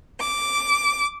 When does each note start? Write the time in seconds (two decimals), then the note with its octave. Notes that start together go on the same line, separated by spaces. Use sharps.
0.21 D6